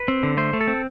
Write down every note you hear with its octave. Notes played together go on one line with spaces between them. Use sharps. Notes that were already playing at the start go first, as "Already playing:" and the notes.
Already playing: B4
C4
D3
A3 C5
A3
A4
C4